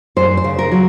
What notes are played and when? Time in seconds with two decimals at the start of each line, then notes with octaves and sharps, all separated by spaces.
0.16 F#2 C5
0.37 C5
0.44 C#3
0.59 A#4
0.72 F#3